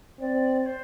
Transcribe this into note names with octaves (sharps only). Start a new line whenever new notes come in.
C4 D5
D5
C5